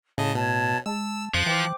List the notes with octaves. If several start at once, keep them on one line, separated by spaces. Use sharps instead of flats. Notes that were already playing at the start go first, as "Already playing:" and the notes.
A2 C#3 D#5 A5
B2 C#5 A5
G#3 A5 E6
F2 F3 F#6
E3 C5 G5 D6